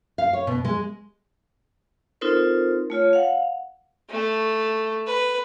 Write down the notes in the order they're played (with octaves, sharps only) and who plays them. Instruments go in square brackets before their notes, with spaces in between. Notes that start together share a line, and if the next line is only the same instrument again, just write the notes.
[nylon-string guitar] F5
C#5
B2
G#3
[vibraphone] C4 D#4 F4 A4 A#4 C5
A3 F4 C#5
F5 F#5
[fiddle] A3
B4